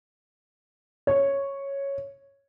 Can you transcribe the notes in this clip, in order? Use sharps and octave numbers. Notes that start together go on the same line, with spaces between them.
C#5